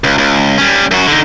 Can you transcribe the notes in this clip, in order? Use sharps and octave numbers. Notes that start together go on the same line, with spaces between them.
C#2
C#2
G3 C#4
F#2 F#4
D3 D#4